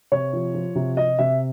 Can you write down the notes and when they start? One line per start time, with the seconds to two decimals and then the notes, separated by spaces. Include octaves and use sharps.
0.12 C3 C#5
0.33 F3
0.54 F3
0.75 C3
0.97 C3 D#5
1.19 C3 E5